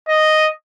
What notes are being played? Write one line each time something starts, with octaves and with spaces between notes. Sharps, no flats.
D#5